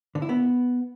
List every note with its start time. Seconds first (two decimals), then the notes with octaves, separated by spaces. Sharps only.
0.15 D3
0.22 E4
0.29 B3